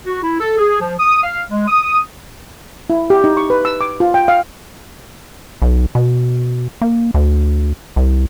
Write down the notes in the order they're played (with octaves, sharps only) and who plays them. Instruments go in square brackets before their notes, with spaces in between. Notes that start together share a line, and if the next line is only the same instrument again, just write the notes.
[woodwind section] F#4
E4
A4
G#4
F3
D#6
F5
G#3
D#6
[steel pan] E4
G4
D#4
C#6
B4
E6
D6
F4
G5
F5
[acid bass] B1
B2
A#3
D2
C2